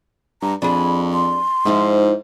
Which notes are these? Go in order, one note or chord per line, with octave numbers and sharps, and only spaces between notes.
G2 A#5
F2 D4 G#4 B5
C6
G#2 F3 D#4 E4